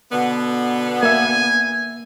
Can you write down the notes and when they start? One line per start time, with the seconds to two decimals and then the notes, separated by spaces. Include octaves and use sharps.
0.12 B2 D3 B3
1.03 A#3 E5 G#5